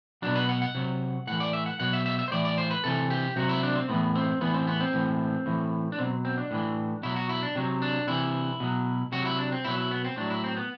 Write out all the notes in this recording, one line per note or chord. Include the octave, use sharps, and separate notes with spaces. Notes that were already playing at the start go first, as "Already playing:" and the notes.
B2 F#3 D4
B4
F#5
F#5
C3 F#3
A2 E3 F#5
D5
E5
F#5
B2 F#3 F#5
E5
E5
E5
C5
A2 E3 D5
D5
C5
B4
C3 E3 A4
G4
C3 F#3 F#4
E4
D4
C4
A2 E3 B3
C4
A2 E3 B3
C4
B3
C4
A2 E3
A2 E3
D4
B2 F#3 C4
C4
D4
A2 E3
B2 F#3 E4
F#4
E4
D4
C3 F#3
D4
C3 E3 E4
B2 F#3
C3 F#3 F#4
E4
D4
C4
B2 F#3 E4
E4
B3
C4
A2 F#3 D4
E4
C4
B3